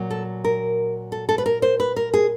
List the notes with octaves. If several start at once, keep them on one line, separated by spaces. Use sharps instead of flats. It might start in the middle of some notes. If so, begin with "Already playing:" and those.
Already playing: A#2 F#3
A4
A#4
A4
A4
B4
A#4
C5
B4
A#4
G#4